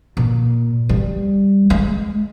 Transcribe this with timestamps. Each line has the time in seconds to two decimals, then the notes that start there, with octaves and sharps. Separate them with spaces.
0.17 A#2
0.89 G3
1.70 G#3